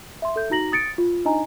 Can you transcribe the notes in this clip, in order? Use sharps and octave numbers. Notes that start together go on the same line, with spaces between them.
E5 C6
A4 E5 G6
D#4 F#4 A#5 A#6 F#7
D#6 A6 C#7 D7
F4
D4 D#4 D#5 G#5 A#5